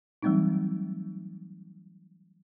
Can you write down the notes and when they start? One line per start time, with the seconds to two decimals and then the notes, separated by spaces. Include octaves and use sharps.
0.22 E3 F#3 G3 A3 C4 D#4